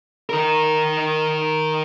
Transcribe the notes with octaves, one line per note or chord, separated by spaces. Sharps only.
D#3 A#4